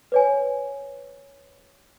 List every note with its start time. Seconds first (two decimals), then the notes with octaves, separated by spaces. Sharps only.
0.12 B4 C#5 G#5